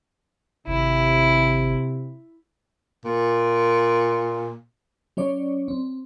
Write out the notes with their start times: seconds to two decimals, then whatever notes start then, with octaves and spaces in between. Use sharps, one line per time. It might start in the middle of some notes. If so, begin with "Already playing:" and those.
0.67 G#1 C3 E4
3.04 A#2
5.17 F#3 C#4 C#5 D5
5.68 C4